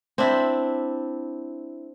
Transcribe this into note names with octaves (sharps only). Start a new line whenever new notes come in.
C4 D4 E4